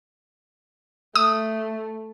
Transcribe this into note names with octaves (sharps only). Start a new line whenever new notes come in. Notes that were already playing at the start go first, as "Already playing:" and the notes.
A3 D#6